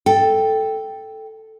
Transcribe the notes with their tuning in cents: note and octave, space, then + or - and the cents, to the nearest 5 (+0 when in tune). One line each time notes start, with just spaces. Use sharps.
A4 +0 G5 +0